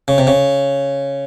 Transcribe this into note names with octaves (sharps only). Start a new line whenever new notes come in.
C#3
C3
C#3